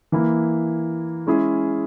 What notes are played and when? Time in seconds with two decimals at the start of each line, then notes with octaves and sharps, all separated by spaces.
0.12 E3 A#3 E4
1.27 G#3 C#4 E4 G#4